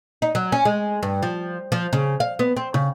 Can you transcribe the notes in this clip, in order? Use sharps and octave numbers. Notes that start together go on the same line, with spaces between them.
D#4
F#3
C#4
G#3
G2
F3
F3
C#3
F5
B3
C4
C#3